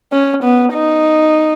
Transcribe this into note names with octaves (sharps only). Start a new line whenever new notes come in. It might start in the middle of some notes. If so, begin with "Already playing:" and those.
C#4
B3
D#4